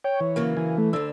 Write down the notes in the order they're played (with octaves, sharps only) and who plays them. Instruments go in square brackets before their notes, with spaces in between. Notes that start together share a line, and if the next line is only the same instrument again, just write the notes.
[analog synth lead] C#5 [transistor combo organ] G5
[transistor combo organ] E3
[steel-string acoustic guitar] C#3 F#3 A#3
[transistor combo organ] E3 [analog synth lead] G#5
[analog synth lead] A3
[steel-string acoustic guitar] D2 D3 [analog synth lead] E6